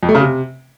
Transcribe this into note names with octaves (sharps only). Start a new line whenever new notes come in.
F2
A3
C#3
C3